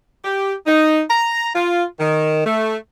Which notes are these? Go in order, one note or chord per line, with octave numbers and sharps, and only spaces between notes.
G4
D#4
A#5
F4
D#3
A3